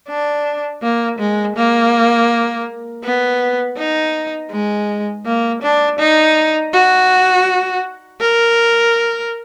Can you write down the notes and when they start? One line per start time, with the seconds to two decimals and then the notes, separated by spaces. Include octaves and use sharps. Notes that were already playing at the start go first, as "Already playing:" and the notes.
0.09 D4
0.82 A#3
1.19 G#3
1.57 A#3
3.04 B3
3.78 D#4
4.51 G#3
5.25 A#3
5.63 D4
5.99 D#4
6.73 F#4
8.20 A#4